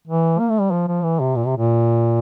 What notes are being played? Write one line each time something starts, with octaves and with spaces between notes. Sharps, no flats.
E3
A#3
A3
G3
F3
F3
E3
C3
A#2
C3
A#2